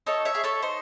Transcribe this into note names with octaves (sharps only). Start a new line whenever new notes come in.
D#4 A4 C#5
C#5 E5
G#4
A4 C#5
D#4 C5